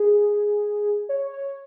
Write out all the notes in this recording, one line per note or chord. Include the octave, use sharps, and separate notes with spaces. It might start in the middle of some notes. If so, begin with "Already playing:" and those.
Already playing: G#4
C#5
C#5